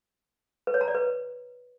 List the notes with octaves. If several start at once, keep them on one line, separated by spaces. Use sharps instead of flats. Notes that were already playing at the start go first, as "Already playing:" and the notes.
B4
C#5
A#5
D5
B4